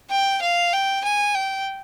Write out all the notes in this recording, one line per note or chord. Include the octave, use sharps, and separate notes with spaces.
G5
F5
G5
G#5
G5